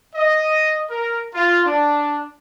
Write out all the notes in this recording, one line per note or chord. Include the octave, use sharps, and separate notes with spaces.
D#5
A#4
F4
D4